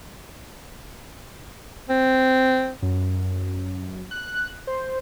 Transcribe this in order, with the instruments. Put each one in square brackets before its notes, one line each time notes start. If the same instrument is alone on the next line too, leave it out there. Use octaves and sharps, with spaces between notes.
[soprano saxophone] C4
[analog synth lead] F#2
F#6
C5